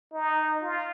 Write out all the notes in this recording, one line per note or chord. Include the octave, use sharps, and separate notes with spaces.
D#4
F4